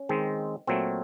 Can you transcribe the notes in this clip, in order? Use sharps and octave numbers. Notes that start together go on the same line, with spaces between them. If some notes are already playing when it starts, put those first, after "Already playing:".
Already playing: C#4
D#3 G#3 C4
A#2 F#3 A3 C4